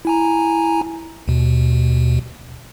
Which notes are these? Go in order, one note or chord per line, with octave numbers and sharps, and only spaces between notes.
E4 G#5 A#5
D#2 B2